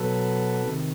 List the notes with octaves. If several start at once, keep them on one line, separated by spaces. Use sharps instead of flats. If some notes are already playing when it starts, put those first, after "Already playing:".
Already playing: B2 F#3 A4 B4
C3 D#3